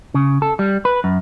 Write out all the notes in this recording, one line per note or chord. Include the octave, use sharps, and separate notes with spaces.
C#3
A4
G3
B4
F#2